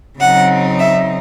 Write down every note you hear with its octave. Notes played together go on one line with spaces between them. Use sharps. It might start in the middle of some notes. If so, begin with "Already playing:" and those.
C#3 F#3 C4 D#4 F#5
E5